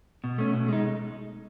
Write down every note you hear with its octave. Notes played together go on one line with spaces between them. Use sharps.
B2
A3 C#4
B2
G#3 D#4